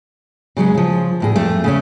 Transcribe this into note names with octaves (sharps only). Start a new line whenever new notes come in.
C#3 F#3 G#3 C#4
C#3 F3
E2 A2 G#4
F2 A3
C#3 A3 C#4